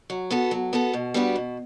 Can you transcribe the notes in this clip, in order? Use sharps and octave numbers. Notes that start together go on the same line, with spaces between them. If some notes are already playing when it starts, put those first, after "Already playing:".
F#3
B3 F#4 A4
F#3
B3 F#4 A4
B2
G3 B3 D4 F#4
B2